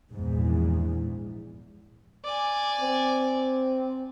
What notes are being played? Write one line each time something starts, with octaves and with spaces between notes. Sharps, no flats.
A#1 E2 G#2
D5 G#5
C4